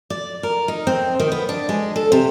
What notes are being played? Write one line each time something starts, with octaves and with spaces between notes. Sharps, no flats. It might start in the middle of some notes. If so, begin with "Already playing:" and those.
D5
A#4
D#4
C4
D#3
B3
D4
G#3
A4
C3